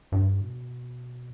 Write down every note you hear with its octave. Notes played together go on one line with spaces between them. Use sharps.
G2
B2